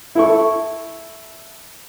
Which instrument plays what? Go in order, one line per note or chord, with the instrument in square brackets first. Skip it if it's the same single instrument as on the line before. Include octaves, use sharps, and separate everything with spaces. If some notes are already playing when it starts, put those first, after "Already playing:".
[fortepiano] E4 A4 C#6